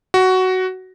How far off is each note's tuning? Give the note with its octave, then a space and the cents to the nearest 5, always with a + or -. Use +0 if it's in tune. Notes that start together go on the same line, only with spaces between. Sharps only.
F#4 +10